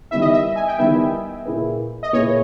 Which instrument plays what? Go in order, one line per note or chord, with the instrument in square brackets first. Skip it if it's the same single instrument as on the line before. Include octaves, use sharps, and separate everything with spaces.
[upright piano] D#3 G3 B3 E4 [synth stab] E5
[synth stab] D#5
E5
G#5
G5
[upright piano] D#3 G3 B3 E4 [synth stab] E5
[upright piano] A#2 A#3 E4 G#4 B4
[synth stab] D#5
[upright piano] A#2 A#3 E4 G#4 B4 [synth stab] C#5